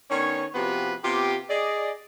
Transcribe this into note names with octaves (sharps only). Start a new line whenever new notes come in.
D#3 B3 C#4 D4 C#5
C3 F3 B3 F#4 G4 B4
C3 B3 F4 G4
G#4 D5 D#5